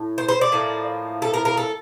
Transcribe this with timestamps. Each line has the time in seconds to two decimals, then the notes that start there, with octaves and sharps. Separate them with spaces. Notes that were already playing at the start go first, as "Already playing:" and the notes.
Already playing: A2
0.18 C5
0.29 C5
0.41 D5
0.52 A2 F3 A#3
1.22 A4
1.34 A#4
1.45 A#4
1.57 A4